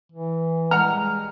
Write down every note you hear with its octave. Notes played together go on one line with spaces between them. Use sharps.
E3
G3 G#3 F#5 A#5 F6